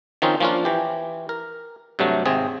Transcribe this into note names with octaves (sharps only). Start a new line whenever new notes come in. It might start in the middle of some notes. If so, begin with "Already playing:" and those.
D#3 F3 C4 C#4 D#4 F4
F3 A#3 C#4 D4 F4
E3 G4
A#4
G2 C3 F#3 A3
G#1 C3 C4 G#4